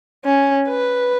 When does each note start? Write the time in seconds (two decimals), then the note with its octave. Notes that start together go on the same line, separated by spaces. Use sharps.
0.25 C#4
0.69 B4